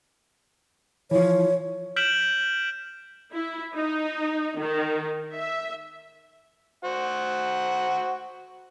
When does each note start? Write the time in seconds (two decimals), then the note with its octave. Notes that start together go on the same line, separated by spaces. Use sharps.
1.11 E3 F3 C#5
1.96 F6 G6 B6 D7 E7 F#7
3.33 E4
3.74 D#4
4.57 D#3
5.35 E5
6.84 F#4 C5 F#5